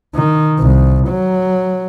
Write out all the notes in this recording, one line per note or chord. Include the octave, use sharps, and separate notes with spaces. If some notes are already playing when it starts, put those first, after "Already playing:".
D#3
C2
F#3